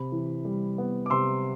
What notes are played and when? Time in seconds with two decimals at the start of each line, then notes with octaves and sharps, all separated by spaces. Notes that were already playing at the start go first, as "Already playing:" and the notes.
Already playing: C3 B5
0.12 E3
0.45 G3
0.78 B3
1.06 D6
1.10 C3 C6 E6